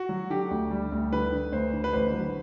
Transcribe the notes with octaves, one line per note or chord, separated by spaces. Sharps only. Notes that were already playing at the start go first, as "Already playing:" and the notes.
Already playing: F#4
F#3
D3 G4
D2
G3
D2
D3 B4
D3
D2 C5
D3
B4
A1 C5
F#3